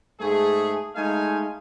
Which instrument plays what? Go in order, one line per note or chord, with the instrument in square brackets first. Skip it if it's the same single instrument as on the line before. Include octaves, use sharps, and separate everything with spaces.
[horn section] G#2 A3 G#4
G#3 A3 D#4 F5 G#5